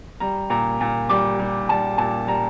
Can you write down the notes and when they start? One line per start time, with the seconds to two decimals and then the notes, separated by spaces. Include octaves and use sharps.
0.20 G3 A#5
0.50 A#2 A#5
0.81 A#2
1.09 G3 D6
1.39 G3
1.69 G3 A5
1.98 A#2 A5
2.28 G3 A#5